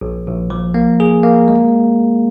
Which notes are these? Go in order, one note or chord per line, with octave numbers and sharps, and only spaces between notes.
A#1
A#1
F3
A#3
G#4
A#3
G#3